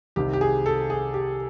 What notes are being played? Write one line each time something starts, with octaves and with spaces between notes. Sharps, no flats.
C2 C3 D#3 G4
G4
G#4
A4
G#4
G4